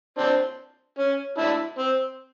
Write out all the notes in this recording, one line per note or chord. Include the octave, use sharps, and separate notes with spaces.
C4 D4
C#4
D4 E4
C4